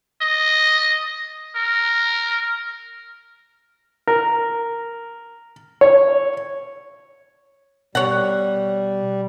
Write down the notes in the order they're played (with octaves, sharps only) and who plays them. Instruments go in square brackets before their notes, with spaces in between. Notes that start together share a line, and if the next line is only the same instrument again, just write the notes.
[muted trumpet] D#5
A#4
[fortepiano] A#4
C#5
[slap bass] B2 [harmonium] G3 [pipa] C#5 F#5